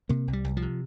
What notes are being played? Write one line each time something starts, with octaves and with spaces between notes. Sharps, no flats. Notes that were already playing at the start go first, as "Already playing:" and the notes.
C3 A#3
C2
G3
C2
F3
C3